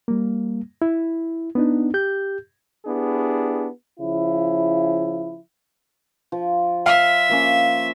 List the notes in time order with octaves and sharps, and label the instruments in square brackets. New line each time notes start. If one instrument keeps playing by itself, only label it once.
[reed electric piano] G3 A#3
E4
B3 D4 D#4
G4 G6
[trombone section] B3 D4 E4 G4 G#4
C#3 F3 E4
[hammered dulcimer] F3
[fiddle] E5 [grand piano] F5
[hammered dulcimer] F3 A#3 C#4